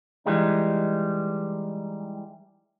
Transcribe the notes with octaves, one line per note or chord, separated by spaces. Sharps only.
E3 G3 G#3 D#4